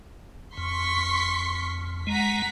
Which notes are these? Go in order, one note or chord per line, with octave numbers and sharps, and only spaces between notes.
F2 C6 C#6 B6
G#3 F#5 A#5 B6